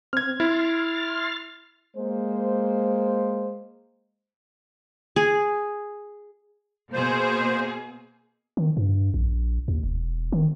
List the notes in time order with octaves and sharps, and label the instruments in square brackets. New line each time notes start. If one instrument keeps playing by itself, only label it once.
[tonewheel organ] C4 [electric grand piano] F6 G#6
[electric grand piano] E4 [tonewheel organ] C6 F6 A6
[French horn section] G#3 A#3 C5
[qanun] G#4
[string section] B2 A#3 G#4 [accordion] C5
[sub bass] D#3
G2
A#1
D#2
E1
D#3